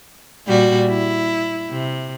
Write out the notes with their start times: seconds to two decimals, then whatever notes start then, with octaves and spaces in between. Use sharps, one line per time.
0.47 A#2 G3 F#4
0.89 E4
1.70 C3